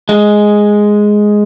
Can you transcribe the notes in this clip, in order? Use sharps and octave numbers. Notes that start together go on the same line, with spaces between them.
G#3